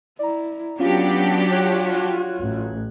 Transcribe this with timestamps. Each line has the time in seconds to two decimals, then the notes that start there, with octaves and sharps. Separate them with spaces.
0.19 E4 D5 A#5
0.79 F#3 B3 C#4 D4 F4 G4 F5
1.51 F4 F#4 C#5 F#6 G#6
2.41 A1